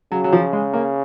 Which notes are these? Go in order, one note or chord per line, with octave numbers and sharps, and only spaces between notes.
C#3 F#3
F#3
F3
G#3
A#3